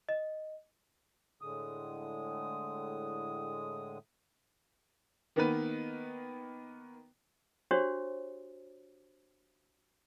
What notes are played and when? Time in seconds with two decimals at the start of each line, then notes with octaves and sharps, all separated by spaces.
0.09 D#5
1.41 A2 D3 G#3 D#6
5.36 D#3 A#3 B3 B4
7.71 D4 F#4 G4 C5 C#5